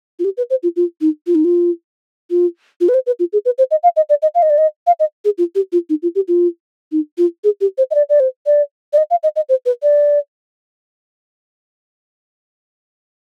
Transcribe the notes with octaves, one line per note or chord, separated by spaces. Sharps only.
F4
G4
B4
C5
F4
F4
D#4
F4
D#4
F4
F4
F4
B4
C5
B4
F4
G#4
B4
C5
D#5
F5
D#5
D5
D#5
F5
D#5
D5
D#5
F5
D#5
G#4
F4
G4
F4
D#4
F4
G4
F4
D#4
F4
G#4
G4
C5
D#5
D5
D5
C5
D5
D5
D#5
F5
D#5
D#5
C5
B4
D5